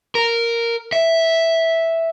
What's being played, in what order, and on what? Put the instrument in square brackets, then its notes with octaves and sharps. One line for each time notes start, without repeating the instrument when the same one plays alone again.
[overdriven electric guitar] A#4
E5